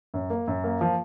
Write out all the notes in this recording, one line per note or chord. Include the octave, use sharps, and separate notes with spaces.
F#2
A#3
F#2
A#3
F3